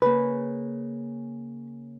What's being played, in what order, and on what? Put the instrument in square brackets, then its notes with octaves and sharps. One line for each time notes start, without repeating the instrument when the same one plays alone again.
[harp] C#3 A#3 [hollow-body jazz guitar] B4